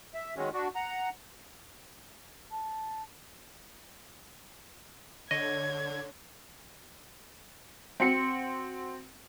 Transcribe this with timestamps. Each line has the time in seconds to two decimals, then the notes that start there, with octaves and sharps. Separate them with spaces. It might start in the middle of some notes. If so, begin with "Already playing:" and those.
0.14 E5
0.36 D#3 F#3 G#3 C#4
0.53 D4 F#4
0.75 F#5 A#5
2.51 A5
5.31 D3 C#5 D#5 G#6
8.00 C4 F#4 C#7